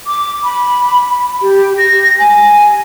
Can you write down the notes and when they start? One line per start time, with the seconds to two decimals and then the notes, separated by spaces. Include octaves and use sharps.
0.07 D6
0.44 B5
1.42 G4
1.78 A#6
2.19 G#5